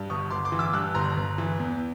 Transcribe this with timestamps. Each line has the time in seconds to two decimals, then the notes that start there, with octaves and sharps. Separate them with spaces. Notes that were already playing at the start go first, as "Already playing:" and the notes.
Already playing: G2
0.10 G1 C#6 D#6
0.30 G1 C6 D6
0.45 C6 D6
0.52 E3
0.59 D6 E6
0.73 G2 E6 F#6
0.95 G1 A#5 C6
1.17 G1
1.38 E3
1.59 E2